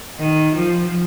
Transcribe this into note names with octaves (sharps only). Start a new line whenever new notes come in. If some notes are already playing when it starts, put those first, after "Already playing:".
D#3
F3